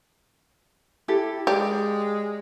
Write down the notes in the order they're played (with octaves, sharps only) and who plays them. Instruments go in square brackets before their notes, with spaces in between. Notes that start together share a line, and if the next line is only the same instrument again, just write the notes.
[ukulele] E4 G4 A4
[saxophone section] G#3 [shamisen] G4 [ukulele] D5